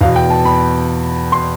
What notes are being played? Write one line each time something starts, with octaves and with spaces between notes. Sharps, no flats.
E2 B2 F5
G5
A5
B5
C6